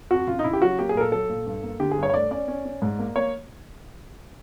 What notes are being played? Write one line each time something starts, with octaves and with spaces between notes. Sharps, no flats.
F2 F#4
C#3 F4
D#4
C#3 E4
G4
F#3 F#4
A#3 G4
G#4
A#2 A#4
A4
F#3 A4
A#2
G2
A#3
D3 G4
G#4
G2 C#5
C#5
A3 D5
C#4 D5
C#4
C#4
G#2
A#3
A#3 C#5